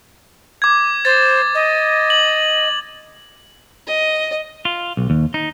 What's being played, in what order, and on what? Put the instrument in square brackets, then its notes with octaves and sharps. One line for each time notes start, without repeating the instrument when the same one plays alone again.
[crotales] D6 G#6
[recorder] C5 [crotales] A6
[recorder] D#5
[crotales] F#7
[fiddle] D#5
[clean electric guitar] F4
B1
D#2
D#4